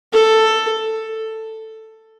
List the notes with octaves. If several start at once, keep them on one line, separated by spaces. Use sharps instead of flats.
A4